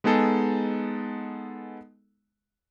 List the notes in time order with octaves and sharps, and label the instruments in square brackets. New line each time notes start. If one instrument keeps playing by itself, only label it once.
[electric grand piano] G#3 B3 D#4 G#4 A4